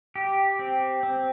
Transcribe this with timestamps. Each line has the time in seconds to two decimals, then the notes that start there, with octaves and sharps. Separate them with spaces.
0.16 G4
0.59 C4
1.03 C4